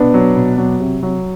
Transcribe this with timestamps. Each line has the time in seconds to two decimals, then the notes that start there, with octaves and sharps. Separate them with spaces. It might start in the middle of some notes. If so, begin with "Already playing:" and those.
Already playing: B2 B3 D4
0.14 F#3
0.36 B2
0.58 F#3
0.80 C3
1.03 F#3